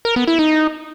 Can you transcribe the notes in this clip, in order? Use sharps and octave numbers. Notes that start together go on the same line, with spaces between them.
A#4
B3
E4
D#4